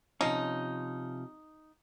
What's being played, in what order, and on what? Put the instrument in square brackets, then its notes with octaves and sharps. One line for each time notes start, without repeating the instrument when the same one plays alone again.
[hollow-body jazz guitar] C3 F3 C#4 [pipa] D#4